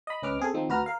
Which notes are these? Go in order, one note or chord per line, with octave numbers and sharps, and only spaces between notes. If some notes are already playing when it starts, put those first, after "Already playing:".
D#5 B5
C#2 C#4 B4 D#5 D6 F6
C4 G#4 A4
D#3 F3 C4 D#4
D2 F#4 B4 A#5 F6
A#4 F5